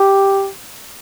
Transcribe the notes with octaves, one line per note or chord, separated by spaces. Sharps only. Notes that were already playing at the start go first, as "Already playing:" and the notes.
Already playing: G4